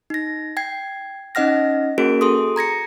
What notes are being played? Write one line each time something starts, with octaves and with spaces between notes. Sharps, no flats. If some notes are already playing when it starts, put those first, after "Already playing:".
D#4 A#6
G5 G#6 C7
C#4 D#4 D#5 F#5 F6 A#6
A#3 C#4 F#4 G#4 A#4 D7
G#4 A4 C6 D#6
A#5 G#6 A#6 C#7